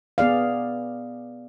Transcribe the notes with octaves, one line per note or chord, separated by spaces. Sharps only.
B3 G#4 D5 F5